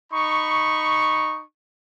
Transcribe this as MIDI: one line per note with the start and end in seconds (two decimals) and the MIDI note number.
0.12 1.41 63
0.12 1.41 83
0.12 1.41 85